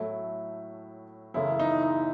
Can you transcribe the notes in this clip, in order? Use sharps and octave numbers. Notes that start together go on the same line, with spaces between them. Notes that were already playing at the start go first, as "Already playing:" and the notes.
Already playing: A2 F#3 A3 E4
F#2 C#3 E3 A3 E4
D#4
D#4